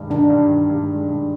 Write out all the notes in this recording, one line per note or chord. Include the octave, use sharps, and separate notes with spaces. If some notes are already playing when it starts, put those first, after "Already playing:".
Already playing: G2 D#3 G#3
D#3 D4
G2
D#3
G2
G#3
G2